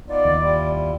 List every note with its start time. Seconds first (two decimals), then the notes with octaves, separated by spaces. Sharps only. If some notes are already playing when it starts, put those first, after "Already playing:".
0.07 B3 D#4 F4 D5
0.25 D#2
0.40 G3 E4 F4